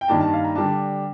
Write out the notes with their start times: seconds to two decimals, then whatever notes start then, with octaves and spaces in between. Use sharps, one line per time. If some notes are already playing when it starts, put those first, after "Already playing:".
0.01 G5
0.08 G2 D#3 A#3 D4 A5
0.21 A5
0.33 F5
0.44 A#5
0.55 D3 G3 D4 A5